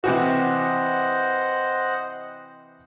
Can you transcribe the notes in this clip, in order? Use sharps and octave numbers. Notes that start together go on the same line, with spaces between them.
C3 E3 F#4 C5 D#5 F#5